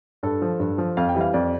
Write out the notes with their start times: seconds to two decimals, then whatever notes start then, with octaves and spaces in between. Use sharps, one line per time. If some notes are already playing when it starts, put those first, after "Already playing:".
0.23 G2 A4
0.42 F3
0.60 G2
0.78 F3
0.97 F2 F5
1.09 G5
1.15 E3 G3
1.21 F5
1.34 F2 D5